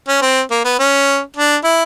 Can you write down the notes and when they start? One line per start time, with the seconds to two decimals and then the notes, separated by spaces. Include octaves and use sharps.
0.08 C#4
0.21 C4
0.51 A#3
0.65 B3
0.79 C#4
1.37 D4
1.64 E4